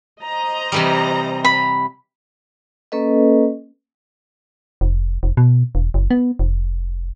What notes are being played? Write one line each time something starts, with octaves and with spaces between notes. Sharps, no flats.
C5 D#5 A#5
C3 E3 G3
B5
A#3 C#4 A4 B4 D#5
F1
F1
B2
E1
F#1
B3
F1